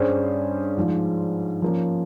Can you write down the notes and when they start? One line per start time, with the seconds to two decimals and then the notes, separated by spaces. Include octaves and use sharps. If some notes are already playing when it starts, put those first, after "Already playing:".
Already playing: G2 G3 C#4 G#4 C5
0.77 G#2 F3 G#3
1.62 F3 A#3 C#4